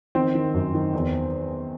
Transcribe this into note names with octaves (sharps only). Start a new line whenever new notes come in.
D#3 C4
D#3
F#2
D#3
E2